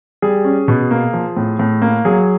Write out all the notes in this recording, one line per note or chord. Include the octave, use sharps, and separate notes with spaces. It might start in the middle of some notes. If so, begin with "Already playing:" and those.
G3 G#4
C#4
B2
A#3
F3
A2
A2
A#3
F#3 G#4